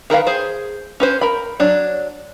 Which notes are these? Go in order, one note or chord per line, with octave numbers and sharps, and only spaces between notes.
D#3 A#4 B4 F5
G#4 C5
C#4 B4 C5
A#4 B5
F#3 D4 C#5